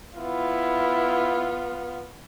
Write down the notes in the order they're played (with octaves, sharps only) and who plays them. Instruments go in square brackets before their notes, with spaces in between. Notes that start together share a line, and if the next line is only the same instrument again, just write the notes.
[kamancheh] B3 F4 [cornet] E4